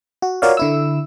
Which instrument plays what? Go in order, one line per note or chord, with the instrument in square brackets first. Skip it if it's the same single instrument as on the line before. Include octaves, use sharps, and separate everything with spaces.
[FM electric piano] F#4
F4 F#4 A#4 C#5 D5 F5
D3 E4 E6